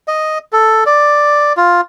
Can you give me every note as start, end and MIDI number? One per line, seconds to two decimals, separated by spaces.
0.08 0.38 75
0.53 0.84 69
0.86 1.53 74
1.57 1.81 65